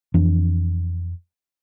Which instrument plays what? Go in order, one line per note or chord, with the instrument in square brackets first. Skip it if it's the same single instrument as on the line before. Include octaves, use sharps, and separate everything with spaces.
[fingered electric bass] F2 E3 D4